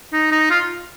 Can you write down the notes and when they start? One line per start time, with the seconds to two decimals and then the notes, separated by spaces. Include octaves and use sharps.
0.13 D#4
0.32 D#4
0.50 F4